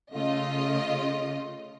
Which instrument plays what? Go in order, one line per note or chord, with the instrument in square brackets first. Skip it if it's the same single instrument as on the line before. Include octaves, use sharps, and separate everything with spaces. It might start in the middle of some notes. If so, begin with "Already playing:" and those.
[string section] C#3 A3 F4 D#5